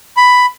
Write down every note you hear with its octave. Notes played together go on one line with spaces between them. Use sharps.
B5